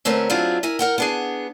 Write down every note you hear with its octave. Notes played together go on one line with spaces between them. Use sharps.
D2 A3 C4 C#4 A#4 B4
F#3 C4 D4 E4 F4 G#4
E4 A#4 G#5
A#4 F#5 G5
B3 D4 G#4